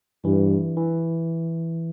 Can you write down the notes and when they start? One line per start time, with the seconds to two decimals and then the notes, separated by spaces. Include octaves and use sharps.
0.25 G2 E3
0.77 E3